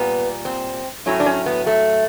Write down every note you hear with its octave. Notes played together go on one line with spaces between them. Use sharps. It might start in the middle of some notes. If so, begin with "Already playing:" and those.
Already playing: A#2 G3 B3
C4
A2 F#3 A3 C#4
D4
C#4
B3
A3